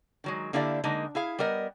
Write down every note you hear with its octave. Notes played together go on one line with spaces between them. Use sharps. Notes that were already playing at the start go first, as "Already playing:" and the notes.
D#3 F#3 G#3
D3 A#3 E4 G4 D5 F5
D3 G#3 A#3 D#4
E4 G#4 F5
G3 B3 A#4 D#5